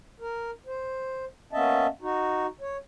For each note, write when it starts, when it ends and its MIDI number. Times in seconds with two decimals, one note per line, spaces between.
0.20 0.51 70
0.66 1.25 72
1.53 1.87 58
1.53 1.87 59
1.53 1.87 61
1.53 1.87 75
1.53 1.87 76
1.53 1.87 81
2.02 2.46 63
2.02 2.46 66
2.61 2.77 73